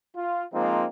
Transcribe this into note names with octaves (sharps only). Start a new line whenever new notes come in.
F4
F3 G#3 A#3 C4 D#4 F4